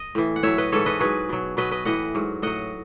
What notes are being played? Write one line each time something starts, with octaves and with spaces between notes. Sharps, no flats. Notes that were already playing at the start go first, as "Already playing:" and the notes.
Already playing: D#5
A2 E3
F#5
A2 F#3 C#5 E5
B4 D#5
G#2 E3 A4 C#5
B4 D#5
G#2 F#3 G#4 B4
B2 F#3
B2 F#3 B4 D#5
B4 D#5
A2 E3 D#5 F#5
G#2 F#3
A2 F#3 D#5 F#5